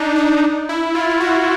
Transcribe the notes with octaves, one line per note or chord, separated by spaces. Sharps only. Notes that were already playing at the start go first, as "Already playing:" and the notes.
Already playing: D4 D#4
D4
E4
F4
F4
F#4